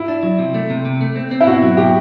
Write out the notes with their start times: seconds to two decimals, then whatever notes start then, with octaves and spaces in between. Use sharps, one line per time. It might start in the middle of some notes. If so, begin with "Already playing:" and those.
Already playing: E4
0.08 D4
0.23 F#3
0.38 C3
0.54 A3
0.70 C3
0.85 C3
1.01 A3
1.16 C4
1.31 C4
1.41 E4
1.47 B2 F#4
1.62 F#3
1.77 B2 G4